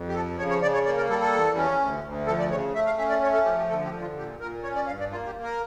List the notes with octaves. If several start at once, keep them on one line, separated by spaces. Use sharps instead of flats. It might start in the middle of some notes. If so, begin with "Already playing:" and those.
Already playing: F2
G4
F3 A4
C#3 C#5
C#5
C#3 D5
C#5
A#3 D5
A#4
G3 A4
A4
E2
C#4
D2
D2
F3 A4
D5
C#3 C#5
A3 E5
F5
C#4 E5
D5
A3 C#5
A4
F3 G4
G4
D3 A4
G4
D3
F4
A#2 G4
A#2 A#4
C#4 C#5
D5
G2 F5
D5
A#3 F4
G4
A#3
A#4